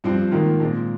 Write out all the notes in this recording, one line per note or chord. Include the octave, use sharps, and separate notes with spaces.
G2 F3 C4
G#2 D#3 A#3 F4
A#2 G#3 C4